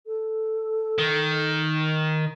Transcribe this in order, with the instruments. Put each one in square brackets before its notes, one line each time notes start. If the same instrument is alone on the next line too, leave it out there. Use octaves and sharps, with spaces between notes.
[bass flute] A4
[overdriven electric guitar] D#3